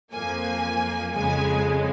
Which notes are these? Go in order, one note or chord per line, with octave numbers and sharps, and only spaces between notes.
F2 F3 A#3 G#5
F2 C#3 G#3 G#5